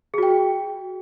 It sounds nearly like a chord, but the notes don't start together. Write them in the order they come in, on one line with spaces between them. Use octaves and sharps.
G#4 F#4 G5